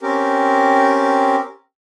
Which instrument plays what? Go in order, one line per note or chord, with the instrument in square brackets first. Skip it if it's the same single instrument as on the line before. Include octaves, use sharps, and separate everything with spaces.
[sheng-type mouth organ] C4 C#4 G4 A#4